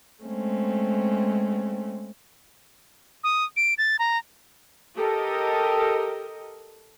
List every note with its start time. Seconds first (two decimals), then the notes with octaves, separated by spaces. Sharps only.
0.24 G#3 A3 C4 C#4
3.24 D#6
3.56 D7
3.78 A6
3.99 A#5
4.96 G4 A4 A#4 D#5